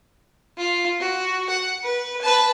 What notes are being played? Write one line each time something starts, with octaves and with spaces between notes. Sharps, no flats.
F4
F#4
F#5
B4
B4 A5